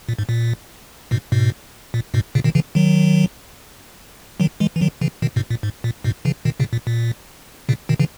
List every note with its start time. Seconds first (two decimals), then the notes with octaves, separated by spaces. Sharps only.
0.09 A#2
0.19 G#2
0.29 A#2
1.11 G#2 B2
1.32 G#2 B2
1.94 A#2
2.14 G#2 B2
2.35 A#2 C#3
2.44 B2 D#3
2.55 C#3 E3
2.75 D#3 F#3
4.40 D#3 F#3
4.60 E3 G#3
4.76 E3
4.81 D#3 F#3
5.01 C#3 E3
5.22 B2 D#3
5.36 G#2 B2
5.51 A#2
5.63 G#2
5.84 A#2
6.04 G#2 B2
6.25 C#3 E3
6.45 B2 D#3
6.60 A#2 C#3
6.73 A#2
6.87 A#2
7.69 A#2 C#3
7.89 B2 D#3
8.00 C#3 E3